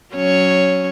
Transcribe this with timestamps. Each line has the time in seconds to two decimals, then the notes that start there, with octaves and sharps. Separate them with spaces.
0.14 F#3 C#4 C#5